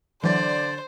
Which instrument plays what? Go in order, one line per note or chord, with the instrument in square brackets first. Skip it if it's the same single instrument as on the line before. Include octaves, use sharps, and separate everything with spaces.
[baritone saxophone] D3 [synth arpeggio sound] E3 F#3 [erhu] C5 [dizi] D5